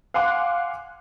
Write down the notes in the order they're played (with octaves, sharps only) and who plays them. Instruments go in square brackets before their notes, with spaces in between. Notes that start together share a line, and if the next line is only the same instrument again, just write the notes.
[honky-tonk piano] F5 F#5 G#5 C6 D6 F#6